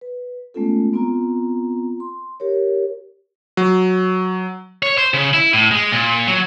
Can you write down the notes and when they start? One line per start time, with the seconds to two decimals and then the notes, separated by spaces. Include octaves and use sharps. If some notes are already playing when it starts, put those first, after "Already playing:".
0.01 B4
0.54 G#3 A3 B3 C#4 F4 A4
0.93 B3 C4 F4 A#5
2.00 C6
2.40 G4 A#4 C#5
3.57 F#3
4.83 C#5
4.98 C5
5.14 C#3
5.34 E4
5.53 A2
5.71 G#3
5.92 A#2
6.27 F#3